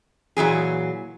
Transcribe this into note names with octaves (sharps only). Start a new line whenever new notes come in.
A#2 E3 F#3 G#4